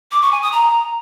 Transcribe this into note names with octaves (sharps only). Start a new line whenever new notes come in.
D6
C#6
G#5
D#6
A#5